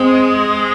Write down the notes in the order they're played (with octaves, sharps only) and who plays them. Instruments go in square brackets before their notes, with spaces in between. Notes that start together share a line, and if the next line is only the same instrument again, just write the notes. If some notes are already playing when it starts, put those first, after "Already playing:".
Already playing: [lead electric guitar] G#3 [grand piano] C4